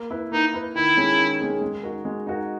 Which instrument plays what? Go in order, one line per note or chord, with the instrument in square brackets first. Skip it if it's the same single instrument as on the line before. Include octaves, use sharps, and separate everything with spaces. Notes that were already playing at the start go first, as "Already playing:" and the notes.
Already playing: [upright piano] A#3
E4 B4
[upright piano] A#3 [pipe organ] D#4
[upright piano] E4 B4
[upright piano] D#3 [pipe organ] E4
[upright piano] G#3 C#4 G#4
D#3
G#3 C#4 G#4
G#3
D#4 F#4 A#4
G#3
D#4 F#4 A#4